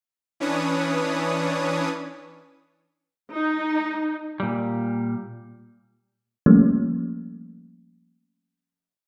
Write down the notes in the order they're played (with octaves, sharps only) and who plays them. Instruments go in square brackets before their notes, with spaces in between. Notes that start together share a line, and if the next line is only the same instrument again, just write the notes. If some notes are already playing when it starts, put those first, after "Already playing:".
[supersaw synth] E3 C#4 D4 B4 C#5 D#6
[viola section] D#4
[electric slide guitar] A#2 G3
[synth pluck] F3 G3 A3 A#3 C#4